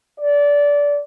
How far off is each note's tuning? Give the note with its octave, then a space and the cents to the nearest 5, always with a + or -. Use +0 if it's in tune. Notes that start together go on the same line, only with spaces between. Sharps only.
D5 -20